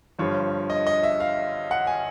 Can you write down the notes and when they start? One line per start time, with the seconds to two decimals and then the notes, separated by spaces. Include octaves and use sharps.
0.19 G1 G2 D3 F3 C#5
0.70 D#5
0.87 D#5
1.03 E5
1.20 F5
1.71 F#5
1.87 G#5